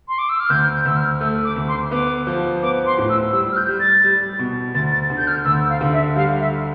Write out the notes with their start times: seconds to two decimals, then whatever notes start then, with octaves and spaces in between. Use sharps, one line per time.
0.08 C6
0.19 D6
0.29 E6
0.40 F6
0.50 D2 G6
0.74 G6
0.85 D2 E6
0.97 F6
1.21 A3 E6
1.45 D6
1.56 D2
1.68 C6
1.91 B3 D6
2.27 F3
2.62 B3 D6
2.86 C6
2.98 A2
3.10 E6
3.33 G3 E6
3.52 F6
3.57 G6
3.69 G3
3.80 A6
4.04 G3
4.39 B2
4.75 D2 A6
4.93 A6
5.10 D3
5.18 G6
5.27 F6
5.45 D2 E6
5.69 F5
5.81 D3
5.93 E5
6.16 G3 F5
6.40 E5